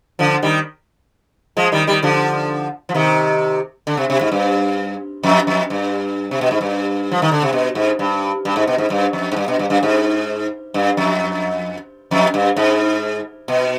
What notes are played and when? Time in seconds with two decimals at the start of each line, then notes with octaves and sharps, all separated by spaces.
0.19 D3 F3
0.42 D#3 G3
1.57 F3 G#3
1.72 D#3 G3
1.87 D#3 G3
2.03 D3 F3
2.89 F3
2.94 C3 D#3
3.87 D3
3.97 C3
4.10 C3
4.21 G#2
4.32 G2
5.23 F2
5.47 F2
5.70 G2
6.31 C3
6.41 B2
6.51 G#2
6.61 G2
7.12 F3
7.22 D#3
7.32 D3
7.42 C3
7.53 B2
7.75 G#2
7.99 G2
8.45 G2
8.56 G#2
8.67 B2
8.78 G#2
8.90 G2
9.13 F2
9.32 G#2
9.36 G2
9.48 B2
9.59 G2
9.70 G2
9.83 G#2
10.74 G2
10.97 F2
12.11 F2
12.34 G2
12.56 G#2
13.48 B2